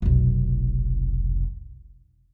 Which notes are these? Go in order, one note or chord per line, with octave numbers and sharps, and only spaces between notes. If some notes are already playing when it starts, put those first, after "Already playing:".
F1 B1